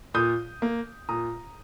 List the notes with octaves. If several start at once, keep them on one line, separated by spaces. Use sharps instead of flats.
A#2 D#6 G6
A#3
A#2 A#5 D#6